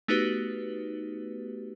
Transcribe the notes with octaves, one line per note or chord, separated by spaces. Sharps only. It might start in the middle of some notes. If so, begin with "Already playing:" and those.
A3 B3 D#4 F#4 G4 B4